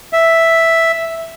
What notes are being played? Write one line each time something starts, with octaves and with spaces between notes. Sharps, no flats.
E5